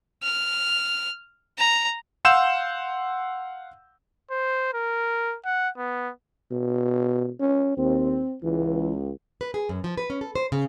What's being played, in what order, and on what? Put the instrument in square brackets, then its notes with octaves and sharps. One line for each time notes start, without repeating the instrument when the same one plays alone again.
[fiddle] F6
A#5
[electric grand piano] F5 F#5 C6 E6 G6 E7
[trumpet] C5
A#4
F#5
B3
[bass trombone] B2
C#4
[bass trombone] D#2 [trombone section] C4
[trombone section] C#2 [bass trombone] E3
[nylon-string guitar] B4
G#4
F#2
F3
B4
C#4
A4
C5
C#3